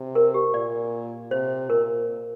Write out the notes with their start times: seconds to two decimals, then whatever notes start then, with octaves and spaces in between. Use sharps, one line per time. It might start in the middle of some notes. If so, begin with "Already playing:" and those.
Already playing: C3
0.15 A#4
0.34 G4
0.54 A#2 D5
1.31 C3 C5
1.69 A#2 A#4